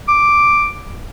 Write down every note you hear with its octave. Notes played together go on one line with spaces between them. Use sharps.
D6